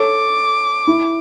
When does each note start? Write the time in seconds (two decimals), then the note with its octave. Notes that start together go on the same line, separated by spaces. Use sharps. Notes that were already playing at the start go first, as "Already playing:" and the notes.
Already playing: A4 C#5 D6
0.87 E4